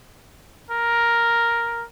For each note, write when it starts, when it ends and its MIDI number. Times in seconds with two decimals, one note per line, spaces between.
0.70 1.84 70